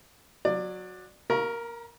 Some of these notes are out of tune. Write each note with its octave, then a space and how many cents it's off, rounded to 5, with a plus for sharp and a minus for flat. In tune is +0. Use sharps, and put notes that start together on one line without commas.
F#3 -15 D5 +20
A#4 +0 A#5 +45 C#6 +0